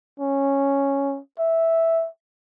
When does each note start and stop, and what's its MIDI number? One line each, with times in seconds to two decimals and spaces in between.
0.20 1.20 61
1.39 2.07 76